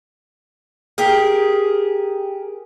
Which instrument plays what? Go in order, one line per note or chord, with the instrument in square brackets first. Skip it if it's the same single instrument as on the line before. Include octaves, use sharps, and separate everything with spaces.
[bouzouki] G4 G#4 A#4